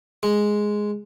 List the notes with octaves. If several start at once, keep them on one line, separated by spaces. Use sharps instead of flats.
G#3